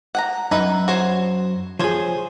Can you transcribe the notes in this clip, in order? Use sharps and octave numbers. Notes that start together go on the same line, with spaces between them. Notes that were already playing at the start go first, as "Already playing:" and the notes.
F#5 G5 A#5
F#2 D#4 B4 E5
F#4 C5 C#5
F3 G#4 C5 C#5